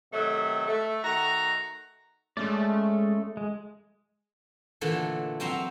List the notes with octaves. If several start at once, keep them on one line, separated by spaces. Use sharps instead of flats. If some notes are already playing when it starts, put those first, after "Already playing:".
C3 D#3 F#3 A3
A3
D#3 A3 F#4 A#5
G#3 A3 C#4 D5
G#3
A#2 D3 E3 A3
F#3 C4 E5 A#5 C6